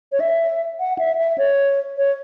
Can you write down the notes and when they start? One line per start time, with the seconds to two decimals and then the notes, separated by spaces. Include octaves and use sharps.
0.12 C#5
0.20 E5
0.80 F#5
0.99 E5
1.19 E5
1.38 C#5
1.97 C#5